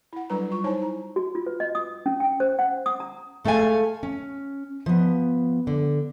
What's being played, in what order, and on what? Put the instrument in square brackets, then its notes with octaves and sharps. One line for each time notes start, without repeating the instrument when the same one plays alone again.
[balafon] E4 F#5
F#3 G3 D4 B4 A#5
F4 C#6
D#4 E4 C5 C#5 G#5 A5
A#5
[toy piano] F#4
F4
B4
D#5
D#6
C#4
G5
C5
F#5
D#6
A#5
[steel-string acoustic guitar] G#3 A3 A4 F5 G#5
C#4
F3 B3
D3